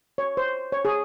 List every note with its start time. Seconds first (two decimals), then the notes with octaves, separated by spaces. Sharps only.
0.18 C#5
0.37 C5
0.72 C#5
0.85 G#4